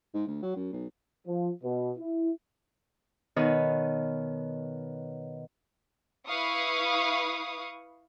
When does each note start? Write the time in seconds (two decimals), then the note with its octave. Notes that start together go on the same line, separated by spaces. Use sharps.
0.14 G#2
0.27 D2
0.42 F#3
0.56 F#2
0.72 B1
1.27 F3
1.63 B2
1.98 E4
3.36 B2 D#3 D#4 B4 C#5
6.26 E4 B4 F5 C#6 D#6